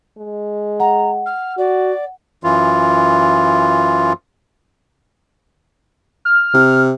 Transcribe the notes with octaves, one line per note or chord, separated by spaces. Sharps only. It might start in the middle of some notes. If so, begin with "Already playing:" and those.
G#3
F#5 A#5
F6
F#4 D5
F#2 E3 F4
F6
C3